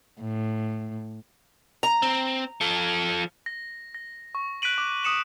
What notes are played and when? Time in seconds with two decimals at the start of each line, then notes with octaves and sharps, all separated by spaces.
0.21 A2
1.83 A#5
2.02 C4
2.61 F3 A4
3.46 A#6
3.94 A#6
4.35 C#6
4.62 F#6 B6 D7 D#7 F#7
4.78 D6
5.03 D#6 C#7 E7 F#7